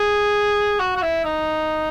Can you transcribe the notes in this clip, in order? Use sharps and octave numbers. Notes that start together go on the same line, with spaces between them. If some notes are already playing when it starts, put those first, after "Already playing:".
Already playing: G#4
F#4
F#4
E4
D#4